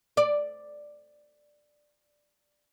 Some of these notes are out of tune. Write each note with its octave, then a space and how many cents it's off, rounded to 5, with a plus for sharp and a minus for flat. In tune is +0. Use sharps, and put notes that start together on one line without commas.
D5 +5